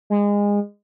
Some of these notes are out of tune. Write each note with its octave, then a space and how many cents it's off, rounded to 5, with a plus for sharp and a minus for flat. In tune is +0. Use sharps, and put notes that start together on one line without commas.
G#3 -25